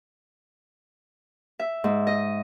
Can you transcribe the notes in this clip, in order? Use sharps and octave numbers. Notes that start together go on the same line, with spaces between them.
E5
G#2
D#5